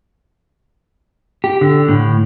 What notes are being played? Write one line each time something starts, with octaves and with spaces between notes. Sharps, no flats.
G4
D3
A2